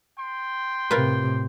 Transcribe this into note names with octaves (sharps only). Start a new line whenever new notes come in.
G5 C6
A2 C3 F4 A#4 B4